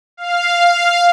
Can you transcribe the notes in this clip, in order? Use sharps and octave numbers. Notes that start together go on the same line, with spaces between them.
F5